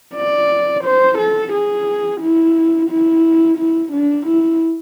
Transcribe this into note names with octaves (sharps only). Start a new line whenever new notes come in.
D5
C5
A4
G#4
E4
E4
E4
D4
E4